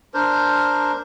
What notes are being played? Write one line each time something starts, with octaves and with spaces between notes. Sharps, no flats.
D4 A#4 C5